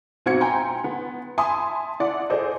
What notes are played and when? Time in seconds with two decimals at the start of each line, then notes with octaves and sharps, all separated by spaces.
0.26 B1 C4 F#4 G#6 C#7
0.41 G5 G#5 A#5 C6
0.84 B3
1.38 E5 G#5 A5 B5 C6 D#6
2.00 E4 D5 F#5
2.30 G#4 A4 C5 D5 D#5